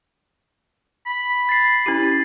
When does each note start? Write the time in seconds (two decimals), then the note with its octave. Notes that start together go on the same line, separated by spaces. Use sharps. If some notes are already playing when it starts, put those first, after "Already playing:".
1.06 B5
1.49 A6 C7
1.86 C#4 E4 G4